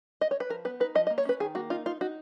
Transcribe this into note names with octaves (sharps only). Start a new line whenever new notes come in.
D#5
C#5
B4
F3 A#4
B3 B4
D#4 B4
F3 D#5
D#5
A#3
C#5
C#4 B4
D#3 G#4
A#3 F#4
D#4 F4
D#4 F4
D#4 F#4